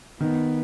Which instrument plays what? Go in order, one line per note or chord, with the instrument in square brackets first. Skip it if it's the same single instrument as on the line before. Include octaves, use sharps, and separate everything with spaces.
[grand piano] D#3 [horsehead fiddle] B3